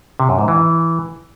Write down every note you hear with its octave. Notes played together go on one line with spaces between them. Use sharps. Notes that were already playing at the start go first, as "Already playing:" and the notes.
C3
F#2
G#2
E3